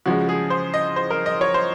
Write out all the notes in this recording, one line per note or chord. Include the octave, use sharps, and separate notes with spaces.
C#3 F3 G#3 F#4
G#4
C5
D#5
C5
A#4
D#5
C#5
C5